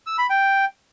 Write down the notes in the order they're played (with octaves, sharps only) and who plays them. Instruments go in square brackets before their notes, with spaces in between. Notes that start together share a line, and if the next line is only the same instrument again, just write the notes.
[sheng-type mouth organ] E6
B5
G5